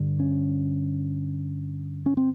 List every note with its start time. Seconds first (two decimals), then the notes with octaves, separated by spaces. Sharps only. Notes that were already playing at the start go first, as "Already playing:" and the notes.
Already playing: G2 D3
0.19 C#4
2.06 C#4
2.17 C4